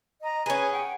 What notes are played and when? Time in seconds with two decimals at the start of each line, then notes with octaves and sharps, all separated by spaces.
0.22 D#5 A#5
0.46 C#4 G#4 B4 G#5
0.72 F#5 G5